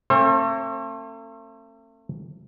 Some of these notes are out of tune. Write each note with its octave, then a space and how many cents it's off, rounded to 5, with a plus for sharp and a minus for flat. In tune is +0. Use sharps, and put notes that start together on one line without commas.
A3 +35 C4 +45 C5 +45